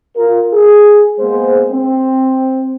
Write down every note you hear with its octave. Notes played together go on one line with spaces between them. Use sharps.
F4 A#4
G#4
G#3 A#3 B3 G#4 C5
C4